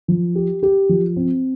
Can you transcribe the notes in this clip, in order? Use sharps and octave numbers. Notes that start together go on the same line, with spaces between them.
F3
G4
G4
F3
C4